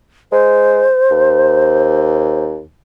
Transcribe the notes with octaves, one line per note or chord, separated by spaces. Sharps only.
G#3 C5
D#2